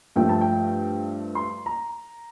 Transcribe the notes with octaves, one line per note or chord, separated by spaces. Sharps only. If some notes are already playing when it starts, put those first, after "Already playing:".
G2 F3 A3 G5
A5
G5
C6
A#5